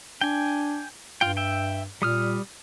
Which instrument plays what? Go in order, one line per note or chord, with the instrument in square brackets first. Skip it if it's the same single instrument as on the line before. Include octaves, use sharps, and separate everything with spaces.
[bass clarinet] D4 [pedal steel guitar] G5 G#5
[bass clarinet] G2 [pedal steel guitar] F4 G5
[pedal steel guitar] E5 G5
[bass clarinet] A#2 [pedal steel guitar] G3 D#6 F6